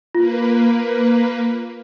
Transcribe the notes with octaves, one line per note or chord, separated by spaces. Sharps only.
A#3 F4 B4